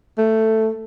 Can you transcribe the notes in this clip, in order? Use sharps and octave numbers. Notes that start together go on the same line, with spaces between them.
A3